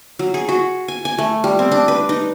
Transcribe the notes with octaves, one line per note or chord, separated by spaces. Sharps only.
F#3
G#4
F#4
G#5
G#5
A3
G3
C4
D4
B4
D#4